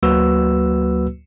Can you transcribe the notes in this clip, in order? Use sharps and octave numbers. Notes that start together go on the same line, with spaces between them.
D2 F#3 A#3 F#4 B4 E6